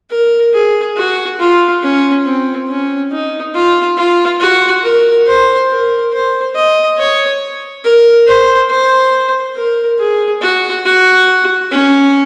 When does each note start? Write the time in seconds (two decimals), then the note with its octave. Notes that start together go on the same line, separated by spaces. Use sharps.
0.11 A#4
0.53 G#4
0.97 F#4
1.40 F4
1.83 C#4
2.25 C4
2.68 C#4
3.12 D#4
3.54 F4
3.97 F4
4.40 F#4
4.83 A#4
5.27 C5
5.70 A#4
6.13 C5
6.55 D#5
6.98 C#5
7.84 A#4
8.27 C5
8.70 C5
9.56 A#4
9.99 G#4
10.42 F#4
10.85 F#4
11.71 C#4